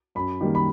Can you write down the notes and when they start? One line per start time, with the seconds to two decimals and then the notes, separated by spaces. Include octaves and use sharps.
0.15 F#2 B5
0.41 D#3 G3 A#3
0.55 B5